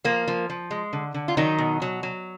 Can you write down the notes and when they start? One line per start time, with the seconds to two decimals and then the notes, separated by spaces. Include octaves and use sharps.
0.04 F3 A#3
0.28 F3
0.50 F3
0.71 G#3
0.93 D3
1.14 D3
1.28 F4
1.37 D#3 F#3 D#4
1.58 B2
1.82 F#3
2.03 F#3